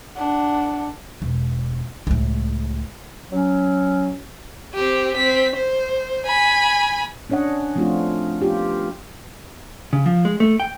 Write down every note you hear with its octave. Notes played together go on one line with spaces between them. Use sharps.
D4 F#5
E1
C#2 A2
F#3 C#4
C4 G4
C4 B6
C5
G#5 B5
C#4 D4 C#5 D#5 F#5
F3 A3 C4 D4 F4 F#4
B3 F4 G4
C#3
F3
G#3
A3
G5